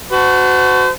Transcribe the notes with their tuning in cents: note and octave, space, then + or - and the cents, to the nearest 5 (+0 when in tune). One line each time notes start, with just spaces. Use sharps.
F#4 +0 C5 -40 A5 +0